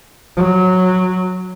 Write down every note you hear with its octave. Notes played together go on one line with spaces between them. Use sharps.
F#3